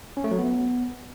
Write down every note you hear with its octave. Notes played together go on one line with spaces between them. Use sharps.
C#4
A3
F#3
B3